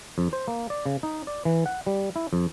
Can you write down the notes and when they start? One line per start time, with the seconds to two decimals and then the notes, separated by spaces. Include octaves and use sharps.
0.18 F2
0.33 C5
0.48 A#3
0.70 D5
0.86 C#3
1.03 D#4
1.27 D5
1.45 E3
1.66 F#5
1.86 G3
2.16 E4
2.33 F2